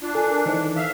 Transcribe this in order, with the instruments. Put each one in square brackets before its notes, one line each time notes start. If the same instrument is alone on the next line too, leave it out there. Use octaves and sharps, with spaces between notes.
[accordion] D4 [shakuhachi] F4
[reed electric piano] A4 [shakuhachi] G#5
[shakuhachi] A#4
[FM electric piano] D#3 E3 [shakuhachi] C5
[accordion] E5 F5